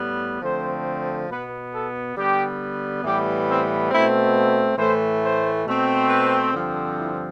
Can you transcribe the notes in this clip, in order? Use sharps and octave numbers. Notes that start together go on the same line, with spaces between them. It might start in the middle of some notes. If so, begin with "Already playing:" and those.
Already playing: A2 G3 B3
D3 F3 A3 C4 C5
B2 B3 B4
A4
D3 G3 B3 G4
A2 E3 G3 B3 G4
C4
B2 A3 C4 E4
A2 E3 A3 C5
C5
B2 A3 C4
B4
G2 D3 F3 C4
E4